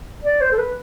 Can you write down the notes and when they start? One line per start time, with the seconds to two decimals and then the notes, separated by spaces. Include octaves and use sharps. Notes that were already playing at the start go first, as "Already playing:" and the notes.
0.24 D5
0.41 C5
0.52 A4
0.58 B4